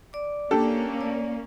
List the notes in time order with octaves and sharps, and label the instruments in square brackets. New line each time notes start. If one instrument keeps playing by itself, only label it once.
[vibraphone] D5 D6
[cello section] A#3 C#4 [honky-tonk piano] D4 G4 A4
[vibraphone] D5